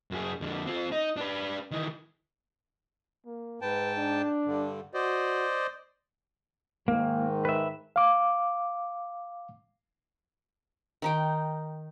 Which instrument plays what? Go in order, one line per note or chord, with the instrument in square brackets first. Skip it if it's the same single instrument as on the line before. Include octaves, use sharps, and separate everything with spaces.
[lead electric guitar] F#2 G#4
F2 D3
C4 F4
D#4
D4 B4
D#3 E3
[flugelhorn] A#3
[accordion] G#2 G5 A5 [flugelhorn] B4
[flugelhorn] D4
[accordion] G2 D3
[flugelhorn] F#4 [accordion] C5 D5 D#5
[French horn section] G#2 D#3 [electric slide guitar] A#3
[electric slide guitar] B4 E5
[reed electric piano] F5 D6
[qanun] D#3 D#4 G5